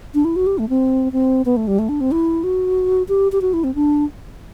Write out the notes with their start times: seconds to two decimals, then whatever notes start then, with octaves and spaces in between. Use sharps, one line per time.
0.15 D4
0.25 E4
0.36 F#4
0.47 G4
0.58 A3
0.69 C4
1.12 C4
1.45 B3
1.57 A3
1.67 G3
1.79 A3
1.89 D4
2.01 C4
2.12 E4
2.44 F#4
3.09 G4
3.32 G4
3.42 F#4
3.53 E4
3.64 C4
3.75 D4